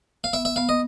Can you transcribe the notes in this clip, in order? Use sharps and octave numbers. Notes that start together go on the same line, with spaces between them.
F5
B3 E5
E5
B3 F5
D#5